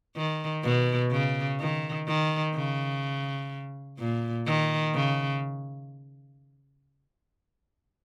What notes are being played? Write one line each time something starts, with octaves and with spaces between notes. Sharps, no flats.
D#3
B2
C#3
D#3
D#3
C#3
A#2
D#3
C#3